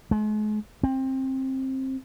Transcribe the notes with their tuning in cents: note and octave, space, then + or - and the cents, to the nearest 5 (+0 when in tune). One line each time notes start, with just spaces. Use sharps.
G#3 +40
C4 +20